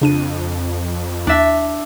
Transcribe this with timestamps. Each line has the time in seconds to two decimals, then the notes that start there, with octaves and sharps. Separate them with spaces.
0.02 F2 C#3 D4 D#7
1.27 D#2 D4 E5